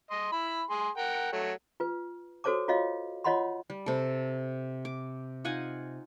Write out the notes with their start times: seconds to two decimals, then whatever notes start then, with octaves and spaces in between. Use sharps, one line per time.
0.11 D#5 C6
0.32 E4 B5
0.70 G#4 C6
0.97 A#4 F#5 G5
1.32 F#3 A3
1.80 F4 B4
2.44 F#4 A4 C5 C#5 A5 D6
2.68 F4 F#4 C#5 D#5 F5
3.24 F4 C#5 D#5 F#5 B5 C6
3.70 G3
3.86 C3 A4
4.85 D6
5.44 D#4 F4 F#5 G#5